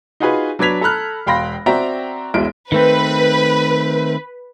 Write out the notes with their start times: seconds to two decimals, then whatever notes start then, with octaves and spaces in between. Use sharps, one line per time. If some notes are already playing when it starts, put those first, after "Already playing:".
0.20 D#4 F4 F#4 G#4 B4 G#5
0.59 F#3 D4 B4 G#6 B6 F7
0.81 A4 A#5 B5 F6 F#6
1.26 E1 F5 G5 B5 C6 A#6
1.66 C4 F#4 D5 E5 G5 A#5
2.34 E1 B1 G#3 E4 D7
2.72 D#3 A3 C4 B4